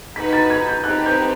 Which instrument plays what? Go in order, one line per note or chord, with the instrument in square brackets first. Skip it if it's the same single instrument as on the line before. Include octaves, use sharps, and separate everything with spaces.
[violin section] D#4 F#4 B4 [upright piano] B6
[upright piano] A6
G#6
G6
[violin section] C4 D#4 G4 B4 [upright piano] F#6
[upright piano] G6